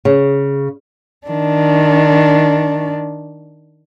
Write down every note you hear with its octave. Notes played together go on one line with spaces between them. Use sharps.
C#3
D#3 D4